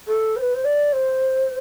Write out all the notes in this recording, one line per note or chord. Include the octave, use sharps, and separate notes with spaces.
A4
C5
B4
C5
D5
C5